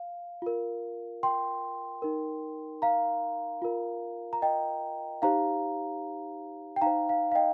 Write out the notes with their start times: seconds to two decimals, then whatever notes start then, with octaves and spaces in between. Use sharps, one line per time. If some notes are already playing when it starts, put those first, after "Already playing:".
Already playing: F5
0.42 F4 A#4
1.23 G5 C6
2.02 D#4 A#4
2.82 F5 A#5
3.62 F4 A#4
4.33 A#5
4.42 D#5 G5
5.22 D#4 G4 C5 F5 A#5
6.76 G5
6.82 D#4 C5 F5 A#5
7.09 F5
7.31 F5
7.35 D#5 G5